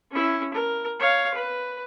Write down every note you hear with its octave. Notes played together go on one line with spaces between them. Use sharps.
C#4 E4
A#4
C#5 F5
B4